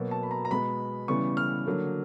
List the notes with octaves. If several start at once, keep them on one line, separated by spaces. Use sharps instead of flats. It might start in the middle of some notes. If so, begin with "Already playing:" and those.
Already playing: B2 F#3 A#3
A5
B5
A#5
A#5
B2 G#3 B3 B5
C#3 E3 G3 B3 C#6
F6
D3 F#3 A#3